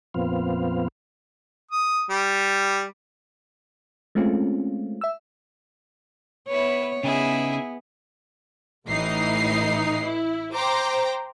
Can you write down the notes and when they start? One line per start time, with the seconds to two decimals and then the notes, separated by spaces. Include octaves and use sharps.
0.14 F2 A#2 F3 B3 C4 F5
1.71 D#6
2.10 G3
4.15 G#3 A3 C4 C#4 F4
5.01 E5 E6
6.48 B3 E4 B4 C#5
7.03 C#3 B3 C#4 D#4 E4 G#4
8.87 A1 A2 E3 D#4 D#5 C7
10.04 E4
10.55 C5 G5 A#5 C6 D6